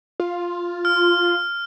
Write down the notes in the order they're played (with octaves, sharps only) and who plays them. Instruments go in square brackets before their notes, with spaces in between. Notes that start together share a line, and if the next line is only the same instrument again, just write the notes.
[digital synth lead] F4
[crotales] F6